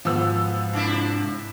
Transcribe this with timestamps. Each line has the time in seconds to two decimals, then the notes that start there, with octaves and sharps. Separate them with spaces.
0.05 G#2 F3 B3 F#4 E6
0.73 C3 D4 E4